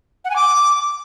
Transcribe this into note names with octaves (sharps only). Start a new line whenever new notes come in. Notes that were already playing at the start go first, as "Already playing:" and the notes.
F#5
G#5
D6